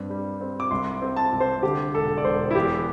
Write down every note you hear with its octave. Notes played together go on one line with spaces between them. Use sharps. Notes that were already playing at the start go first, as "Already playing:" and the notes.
Already playing: G2 C4
G3
C4
D6
C2 C6
C4
A5
C2
C5
D3 G4
E1 A4
D5
E1 C5
E4
E2 G4